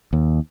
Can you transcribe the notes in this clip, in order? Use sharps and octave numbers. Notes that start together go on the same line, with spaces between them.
D#2